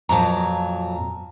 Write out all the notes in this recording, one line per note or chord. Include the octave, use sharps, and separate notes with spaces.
F2 A#2 F#3 A5 A#5